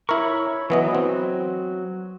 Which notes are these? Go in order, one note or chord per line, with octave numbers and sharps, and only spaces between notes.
E4 A#4 C#5 B5 C#6
E3 F#3 B3 D#5
C4